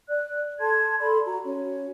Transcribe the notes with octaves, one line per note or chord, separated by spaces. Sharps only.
D5 F#6
A4 A5 C6 G#6
A4 D5 B5 C6
F#4 A#5
C#4 F#4 C#5